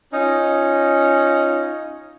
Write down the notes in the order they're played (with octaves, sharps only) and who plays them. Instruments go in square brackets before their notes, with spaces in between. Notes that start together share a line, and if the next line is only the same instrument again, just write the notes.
[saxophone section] C#4 D#4 F4